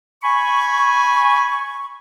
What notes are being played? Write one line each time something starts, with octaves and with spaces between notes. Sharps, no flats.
G#5 B5 C#6